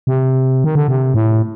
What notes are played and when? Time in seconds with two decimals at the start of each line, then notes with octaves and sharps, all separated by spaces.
0.07 C3
0.64 D#3
0.75 D3
0.88 C3
1.14 A2